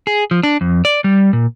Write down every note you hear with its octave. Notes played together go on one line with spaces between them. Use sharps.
G#4
F3
D4
F2
D5
G3
A#2